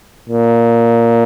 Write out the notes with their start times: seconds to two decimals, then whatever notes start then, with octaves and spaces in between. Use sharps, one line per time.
0.29 A#2